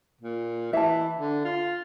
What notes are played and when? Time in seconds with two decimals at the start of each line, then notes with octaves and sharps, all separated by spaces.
0.21 A#2
0.73 E3 E5 A5
1.19 D3
1.45 F4